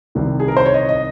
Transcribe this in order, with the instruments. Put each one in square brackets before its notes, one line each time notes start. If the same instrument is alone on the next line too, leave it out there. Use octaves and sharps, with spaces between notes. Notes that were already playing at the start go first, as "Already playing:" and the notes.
[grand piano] C2 C3 D#3
G#4
A#4
C5
C#5
D#5
D#5